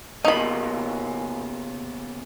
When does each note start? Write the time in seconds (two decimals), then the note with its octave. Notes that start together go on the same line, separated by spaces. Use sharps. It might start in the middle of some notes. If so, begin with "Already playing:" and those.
0.25 C#3 A#3 B3 D#4 B5